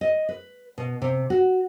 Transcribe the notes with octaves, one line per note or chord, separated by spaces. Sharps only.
D#5
B4
B2
C3
F#4